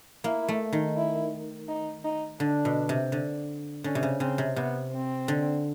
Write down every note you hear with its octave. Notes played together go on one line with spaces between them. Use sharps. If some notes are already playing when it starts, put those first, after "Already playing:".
A#3 E4
A3
D#3
E4
D#4
D#4
D3 D4
B2
C3
D3
D3 C#4
C3
C#3
C#3 C4
C3
C3 B3
C4
D3